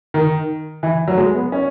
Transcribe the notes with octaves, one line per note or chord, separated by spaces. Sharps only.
D#3
E3
F#3
G#3
B3
C#4